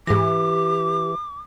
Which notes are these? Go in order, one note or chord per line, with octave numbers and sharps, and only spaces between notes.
G#2 E3 G4 D6 A#6